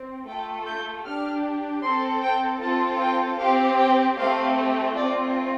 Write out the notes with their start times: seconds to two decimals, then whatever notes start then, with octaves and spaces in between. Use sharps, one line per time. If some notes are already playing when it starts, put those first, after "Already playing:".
Already playing: C4
0.27 A3 F4 A4 G5
0.67 G6
1.05 D4 G4 F6
1.84 C4 A4 C6
2.22 G5
2.62 C4 F4 A4 A5
3.01 G5
3.40 C4 G4 F5
3.79 G5
4.18 A3 C4 G4 F5
4.96 A3 C4 F4 D5